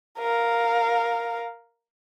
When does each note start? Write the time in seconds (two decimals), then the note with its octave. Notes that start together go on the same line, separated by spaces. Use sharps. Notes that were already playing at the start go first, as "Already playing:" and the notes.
0.19 A#4 F5